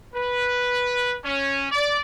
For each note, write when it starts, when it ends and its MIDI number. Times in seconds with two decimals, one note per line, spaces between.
0.14 1.17 71
1.25 1.67 61
1.71 2.00 74